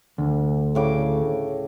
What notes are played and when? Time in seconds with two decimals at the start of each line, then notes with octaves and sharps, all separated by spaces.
0.18 D2
0.75 A2 C#3 D6